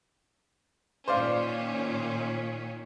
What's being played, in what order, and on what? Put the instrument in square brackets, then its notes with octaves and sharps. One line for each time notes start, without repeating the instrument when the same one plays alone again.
[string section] A#2 D#3 C#4 [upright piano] C5 D5 F5